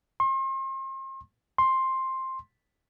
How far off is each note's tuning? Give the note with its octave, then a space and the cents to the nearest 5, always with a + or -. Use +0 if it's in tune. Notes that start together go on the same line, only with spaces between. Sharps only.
C6 +40
C6 +10